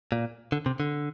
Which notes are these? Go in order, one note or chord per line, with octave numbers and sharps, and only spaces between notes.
A#2
D3
C3
D3